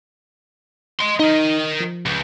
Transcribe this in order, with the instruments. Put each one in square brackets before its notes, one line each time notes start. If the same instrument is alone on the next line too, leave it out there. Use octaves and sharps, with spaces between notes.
[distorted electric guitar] D#5 C6
[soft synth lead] D#4 [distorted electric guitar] A#4 D#5
[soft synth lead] F3
[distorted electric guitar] C#2